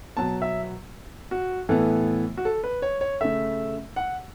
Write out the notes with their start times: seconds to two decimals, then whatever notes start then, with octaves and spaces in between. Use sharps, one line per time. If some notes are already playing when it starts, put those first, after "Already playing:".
0.17 B2 F#3 B3 A5
0.42 E5
1.31 F#4
1.69 A2 E3 B3 A4
2.37 F#4
2.45 A4
2.64 B4
2.82 C#5
3.01 C#5
3.21 C#3 A3 E5
3.96 F#5